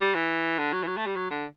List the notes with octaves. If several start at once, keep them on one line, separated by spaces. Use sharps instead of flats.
G3
E3
D3
F#3
E3
F#3
A3
G3
F#3
D3